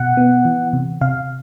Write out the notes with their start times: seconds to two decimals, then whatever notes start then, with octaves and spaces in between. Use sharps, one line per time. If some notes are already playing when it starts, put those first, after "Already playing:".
Already playing: B2 F#5
0.17 B3
0.45 E3
0.73 C3
1.01 C3 F5